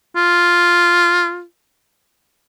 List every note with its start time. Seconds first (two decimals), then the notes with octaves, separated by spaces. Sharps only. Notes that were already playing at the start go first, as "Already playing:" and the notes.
0.16 F4